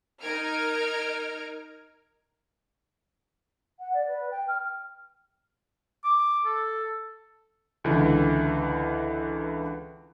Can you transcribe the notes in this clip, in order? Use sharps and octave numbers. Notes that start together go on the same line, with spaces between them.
D#4 A#4 F6 G#6 D7
F#5
D5
B4
G5
F6
D6
A4
C#2 D3 E3